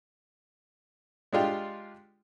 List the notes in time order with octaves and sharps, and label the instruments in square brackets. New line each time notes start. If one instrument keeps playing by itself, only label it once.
[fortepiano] G#3 D4 F4 G4